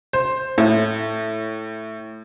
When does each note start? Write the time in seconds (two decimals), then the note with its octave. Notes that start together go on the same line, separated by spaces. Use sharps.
0.13 C5
0.58 A2